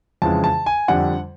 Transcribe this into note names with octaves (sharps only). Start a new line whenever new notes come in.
F2 C#3 E3 G#3 A5
A5
G#5
F2 D3 G3 F#5